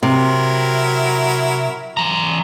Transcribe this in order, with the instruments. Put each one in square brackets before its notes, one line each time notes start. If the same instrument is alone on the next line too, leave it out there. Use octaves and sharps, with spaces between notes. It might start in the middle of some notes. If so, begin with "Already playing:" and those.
[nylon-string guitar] C3 [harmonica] F#3 E4 A#4
[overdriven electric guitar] E3 A#5